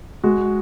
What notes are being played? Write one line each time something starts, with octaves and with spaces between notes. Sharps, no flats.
G#3 F#4